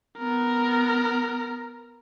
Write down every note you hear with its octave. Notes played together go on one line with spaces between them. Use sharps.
B3 A#4